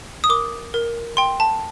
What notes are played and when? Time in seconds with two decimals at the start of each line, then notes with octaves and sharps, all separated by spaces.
0.24 D#6
0.29 A#4 D6
0.74 A#4
1.17 G5 C6
1.40 A5